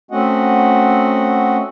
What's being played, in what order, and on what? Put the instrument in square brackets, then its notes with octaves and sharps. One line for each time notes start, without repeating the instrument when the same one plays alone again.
[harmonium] A3 C4 C#4 F#4 D#5 F#5